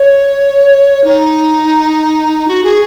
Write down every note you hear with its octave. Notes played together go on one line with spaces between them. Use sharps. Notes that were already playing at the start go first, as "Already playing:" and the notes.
Already playing: C#5
D#4
F#4
G#4